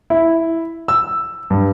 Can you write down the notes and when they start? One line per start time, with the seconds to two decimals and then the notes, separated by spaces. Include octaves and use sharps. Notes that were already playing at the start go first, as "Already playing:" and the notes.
0.10 E4
0.88 E6
1.50 G2